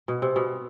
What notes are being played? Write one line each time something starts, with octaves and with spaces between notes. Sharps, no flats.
B2
C3
B2